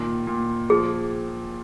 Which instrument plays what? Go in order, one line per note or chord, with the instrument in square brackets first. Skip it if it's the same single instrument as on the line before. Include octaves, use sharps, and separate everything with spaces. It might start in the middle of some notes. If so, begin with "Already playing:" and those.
Already playing: [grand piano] A#2 D#3
A#2
[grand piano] F3 [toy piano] G#4